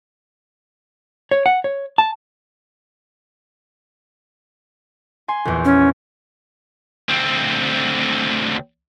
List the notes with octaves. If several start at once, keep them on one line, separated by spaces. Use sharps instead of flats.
C#5
F#5
C#5
A5
G#5 C6
A#1 E2
C#4
D2 C4